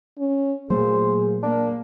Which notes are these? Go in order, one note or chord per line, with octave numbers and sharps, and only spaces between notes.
C#4
A#2 F#3 A3 A#3 G#4 C5
A#3 D4